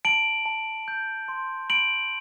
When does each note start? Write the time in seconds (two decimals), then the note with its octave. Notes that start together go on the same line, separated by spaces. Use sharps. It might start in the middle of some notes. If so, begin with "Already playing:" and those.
0.05 A5 D7 F#7
0.46 A5
0.88 G6
1.28 C6
1.70 B5 D7 F#7